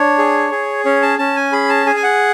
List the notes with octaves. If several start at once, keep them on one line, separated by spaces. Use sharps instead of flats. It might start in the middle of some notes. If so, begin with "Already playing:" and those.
Already playing: D4 C#5
G#4
G#4
C#4 C#5
A5
C#4 A5
G#5
G#4 B5
A5
G#4 G#5
G#5
F#5